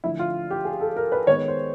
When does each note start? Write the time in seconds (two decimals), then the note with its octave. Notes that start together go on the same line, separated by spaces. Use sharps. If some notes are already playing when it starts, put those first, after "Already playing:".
0.04 D3 F3 A3 E4
0.19 F4
0.51 G4
0.65 G#4
0.81 A4
0.97 A#4
1.12 B4
1.27 D#3 G#3 B3 C#5
1.48 C5